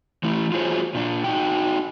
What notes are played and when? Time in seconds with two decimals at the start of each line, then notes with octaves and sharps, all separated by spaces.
0.23 E3 A3 E4
0.52 F4 F#4 G#4 C5 C#5
0.94 A#2 D4
1.24 D#4 F#4 G5